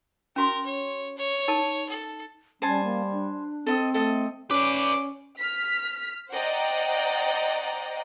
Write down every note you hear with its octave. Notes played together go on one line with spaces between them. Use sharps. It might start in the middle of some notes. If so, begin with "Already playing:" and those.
C#4 F#4 A#4 C6
C#5
C#5
D#4 A#4 A5
A4
G3 C#4 C5 G#5 A5
A#3
D4
C4 A4 D#5
A3 A4 D#5
C#4 B4 D5 D6
F6 B6
C5 D5 D#5 F#5 G5 A#5